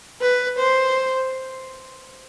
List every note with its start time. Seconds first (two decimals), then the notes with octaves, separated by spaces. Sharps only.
0.22 B4
0.58 C5